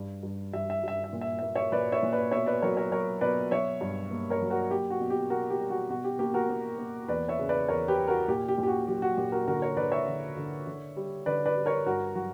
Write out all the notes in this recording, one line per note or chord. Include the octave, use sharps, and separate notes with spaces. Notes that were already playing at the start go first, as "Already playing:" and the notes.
Already playing: G2
G2
G2 E5
E5
G2 E5
E5
A#2
E5
E5
A#3
C#5 E5
A#2 B4 D5
C#5 E5
A#2
B4 D5
B2 C#5 E5
B4 D5
F#3 A#4 C#5
A#4 C#5
F#3 A#4 C#5
B2 B4 D5
F#3 C#5 E5
G2
A#3
A#4 C#5
F#3
F#4 A#4
A#3 G4
F#4
B2
G4
B2 F#4 A#4
G4
G3
F#4
B2 F#4
G4
A#3 G4
F#4 A#4
A#3
A#3
E2 B4 D5
C#5 E5
C#3
B4 D5
E2 A#4 C#5
G4 B4
E3
F#4 A#4
A#2 G4
G4
A#2
G4
F#4
F#3 G4
F#4
A#2 G4
F#4 A#4
D3 F#4 A#4
A#4 C#5
D3 B4 D5
C#5 E5
D3
D3
D3
G3
D3 B4 D5
B4 D5
G3
A#4 C#5
G2 F#4 A#4
F#3 F#4